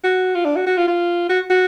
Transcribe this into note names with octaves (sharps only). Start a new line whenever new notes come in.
F#4
F4
D4
F#4
F#4
F4
F4
F#4
F#4